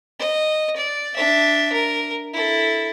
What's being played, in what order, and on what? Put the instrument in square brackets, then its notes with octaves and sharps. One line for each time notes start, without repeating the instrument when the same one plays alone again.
[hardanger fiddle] D#5
D5
D4 E5
A#4
E4 A4